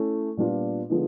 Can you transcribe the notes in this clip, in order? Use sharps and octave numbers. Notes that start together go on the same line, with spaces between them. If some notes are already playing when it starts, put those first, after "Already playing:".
Already playing: A3 C#4 E4
A#2 G3 B3 D4 F4
D3 F3 G#3 B3 D#4